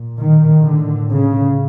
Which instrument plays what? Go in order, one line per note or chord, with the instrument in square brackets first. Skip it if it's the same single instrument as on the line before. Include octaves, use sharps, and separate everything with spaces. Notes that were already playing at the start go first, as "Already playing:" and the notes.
Already playing: [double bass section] A#2
D#3
A2 D3
C#3